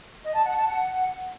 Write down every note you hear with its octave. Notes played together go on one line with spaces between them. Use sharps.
D#5
A5
F#5
A5
F#5